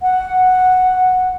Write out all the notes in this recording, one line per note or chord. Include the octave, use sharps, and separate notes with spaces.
F#5